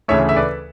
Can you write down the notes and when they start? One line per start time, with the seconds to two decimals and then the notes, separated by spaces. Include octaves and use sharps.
0.08 D2 C#3 E3 A3 C#5 E5
0.29 E5
0.36 B4 D5